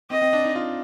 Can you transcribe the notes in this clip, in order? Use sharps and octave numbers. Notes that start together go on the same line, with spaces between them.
C4 D#5
C4
D4
D#4
F4